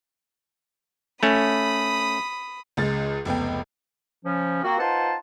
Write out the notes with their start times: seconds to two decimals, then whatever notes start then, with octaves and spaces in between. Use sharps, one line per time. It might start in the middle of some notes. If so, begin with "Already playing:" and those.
1.23 A3 C#4 B5 D#6
2.77 C#2 C#3 G#3 A6
3.25 F1 C#2 B3 G5
4.25 C#3 F3 C#4
4.63 A#3 C4 F#4
4.79 D#4 F4 B4 C5 F#5 A5